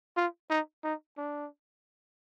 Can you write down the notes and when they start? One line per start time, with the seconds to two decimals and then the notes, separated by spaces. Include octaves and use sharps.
0.17 F4
0.50 D#4
0.84 D#4
1.18 D4